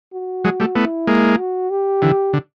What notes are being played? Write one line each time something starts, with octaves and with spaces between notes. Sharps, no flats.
F#4
F#3 G#3
G3 A3
A3 B3 E4
G#3 A#3
F#4
G4
D3 E3
D3